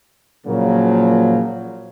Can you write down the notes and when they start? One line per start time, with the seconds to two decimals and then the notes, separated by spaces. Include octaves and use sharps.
0.46 A#2 C#3 F3 F#3 A#3